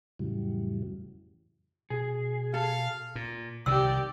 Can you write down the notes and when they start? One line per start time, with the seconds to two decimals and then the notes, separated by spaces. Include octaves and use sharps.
0.19 F2 A2 C#3 E3 F#3 G3
1.90 B2 G#4
2.54 A4 F5
3.15 A#2
3.66 C2 C3 D#3 G4 D5 E6